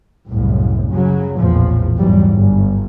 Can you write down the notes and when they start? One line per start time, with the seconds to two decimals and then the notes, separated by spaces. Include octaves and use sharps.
0.29 F#1 C2 A2
0.91 C#3 F#3
1.38 A#1 E2 A2 F3
1.98 E2 G#2 F#3 G3
2.33 G1